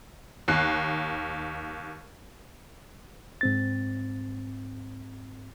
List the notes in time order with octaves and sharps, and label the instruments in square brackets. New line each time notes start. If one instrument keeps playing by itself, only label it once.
[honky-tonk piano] D#2 F#6 C7
[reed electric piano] G#2 C4 A6